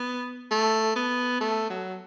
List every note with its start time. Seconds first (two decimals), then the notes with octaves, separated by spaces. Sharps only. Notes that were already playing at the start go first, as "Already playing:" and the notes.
Already playing: B3
0.51 A3
0.96 B3
1.40 A3
1.70 F#3